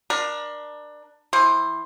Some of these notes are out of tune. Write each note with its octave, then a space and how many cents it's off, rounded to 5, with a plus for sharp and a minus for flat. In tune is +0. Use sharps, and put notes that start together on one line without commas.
D4 +20 A#4 +30
E3 +0 C5 +15